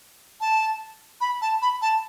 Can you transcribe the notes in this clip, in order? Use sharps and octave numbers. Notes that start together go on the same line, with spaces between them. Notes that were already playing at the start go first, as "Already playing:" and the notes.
A5
B5
A5
B5
A5